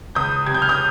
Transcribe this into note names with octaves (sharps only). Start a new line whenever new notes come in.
C#2 D#6 G6
C3 G#6
G6
F6
D#6 G6